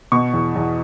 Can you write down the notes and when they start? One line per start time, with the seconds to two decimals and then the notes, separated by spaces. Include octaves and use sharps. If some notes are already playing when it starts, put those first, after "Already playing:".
0.12 B2 C#6
0.34 E2
0.56 E2